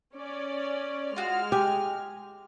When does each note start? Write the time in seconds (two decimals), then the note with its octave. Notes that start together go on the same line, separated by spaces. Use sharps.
0.16 C#4 D5
1.16 G#3 F4 F#4 F6
1.52 G4 G#5